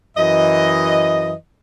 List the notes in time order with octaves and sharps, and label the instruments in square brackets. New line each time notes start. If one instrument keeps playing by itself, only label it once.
[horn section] F#2 E3 D#5